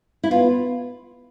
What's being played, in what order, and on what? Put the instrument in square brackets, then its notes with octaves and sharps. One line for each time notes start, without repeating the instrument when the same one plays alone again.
[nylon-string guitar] E4
[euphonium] B3 [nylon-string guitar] F4